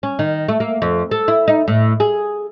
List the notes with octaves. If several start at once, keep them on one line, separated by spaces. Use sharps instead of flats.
C#4
D#3
A3
A#3
F2
A4
E4
D#4
A2
G#4